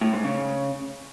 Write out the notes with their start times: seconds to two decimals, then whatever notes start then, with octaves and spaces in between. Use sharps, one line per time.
0.01 A2
0.13 G#2
0.24 C#3